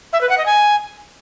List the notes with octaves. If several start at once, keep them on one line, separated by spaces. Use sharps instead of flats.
E5
B4
F#5
D#5
G#5